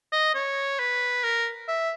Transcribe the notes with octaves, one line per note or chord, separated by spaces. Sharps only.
D#5
C#5
B4
A#4
E5